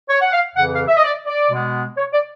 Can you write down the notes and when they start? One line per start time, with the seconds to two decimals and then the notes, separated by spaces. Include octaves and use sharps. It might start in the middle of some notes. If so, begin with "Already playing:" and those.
0.09 C#5
0.21 F#5
0.32 F5
0.56 F2 C#3 E3 F#5
0.72 F5
0.88 E5
0.97 D#5
1.03 D5
1.27 D5
1.50 B2 G#3 B3
1.97 C#5
2.13 D5